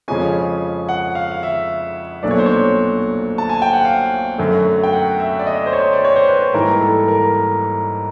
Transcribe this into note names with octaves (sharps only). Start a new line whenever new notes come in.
F2 C#3 F3 G#3 C#4 G#5
F#5
F5
F5
E5
B1 A#2 F#3 A3 D4 D5
C#5
C5
C#5
A5
G#5
G5
F#5
F5
F#2 D3 F#3 A3
G5
F#5
E5
D5
D#5
C5
C#5
D5
C#5
C5
B4
G#2 E3 G3 A#3 A#4
A4
A#4